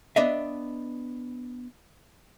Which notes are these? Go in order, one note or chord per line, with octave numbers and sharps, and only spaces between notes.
B3 D4 D#5 E5